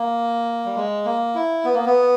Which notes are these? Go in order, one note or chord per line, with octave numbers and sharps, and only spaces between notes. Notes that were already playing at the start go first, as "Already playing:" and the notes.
Already playing: A#3
G3
G#3
A#3
E4
B3
A#3
B3